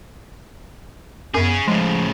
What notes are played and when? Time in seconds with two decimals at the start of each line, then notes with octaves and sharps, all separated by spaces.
1.34 F#2 B3 C#4 G#4
1.68 A2 C#3 F3 G#3